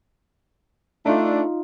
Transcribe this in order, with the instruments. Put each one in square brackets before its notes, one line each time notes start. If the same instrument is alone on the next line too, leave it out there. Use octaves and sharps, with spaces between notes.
[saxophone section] A3 D4 [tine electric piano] D#4 F4